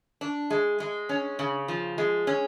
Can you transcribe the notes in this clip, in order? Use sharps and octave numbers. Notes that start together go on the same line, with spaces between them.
D4
G#3
G#3
C#4
C#3
F3
G#3
C#4